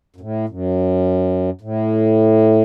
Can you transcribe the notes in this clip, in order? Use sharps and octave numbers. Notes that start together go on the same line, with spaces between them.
F#2
A2
F#2
A2